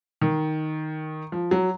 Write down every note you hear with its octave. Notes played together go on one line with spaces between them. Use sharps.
D#3
F3
F#3